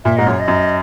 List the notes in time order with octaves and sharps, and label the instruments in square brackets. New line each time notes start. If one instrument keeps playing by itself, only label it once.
[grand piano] A#2 [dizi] E5
[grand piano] G#2 [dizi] D#5
[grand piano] F#2 [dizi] C#5
[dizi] D#5
[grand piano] F#2